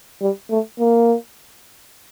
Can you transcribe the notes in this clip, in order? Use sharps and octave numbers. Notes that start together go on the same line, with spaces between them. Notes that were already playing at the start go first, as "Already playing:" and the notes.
G3
A3
A#3